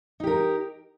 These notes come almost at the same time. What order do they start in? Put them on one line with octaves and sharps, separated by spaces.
D#4 G4 A#4